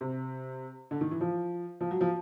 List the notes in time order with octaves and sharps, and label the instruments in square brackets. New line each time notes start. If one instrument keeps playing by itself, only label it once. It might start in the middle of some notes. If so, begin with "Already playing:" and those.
[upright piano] C3
D3
D#3
E3
F3
F3
F#3
F3